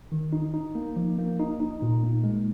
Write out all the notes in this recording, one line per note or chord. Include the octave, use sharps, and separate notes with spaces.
D#3
D#4
D#4
A#3
F3
A#3
D#4
D#4
A#2
A#3
G#3